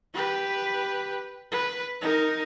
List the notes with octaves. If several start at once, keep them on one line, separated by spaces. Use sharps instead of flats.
G4 B4
B4
D#4 A#4